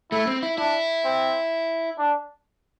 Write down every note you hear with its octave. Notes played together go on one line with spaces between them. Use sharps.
A3 E4
C4
E4
D4 E4
C4
D4